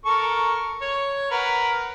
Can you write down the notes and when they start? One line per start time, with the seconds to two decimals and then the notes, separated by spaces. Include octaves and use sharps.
0.05 A4 A#4 C#6
0.81 C#5
1.31 A#4 B4 F#5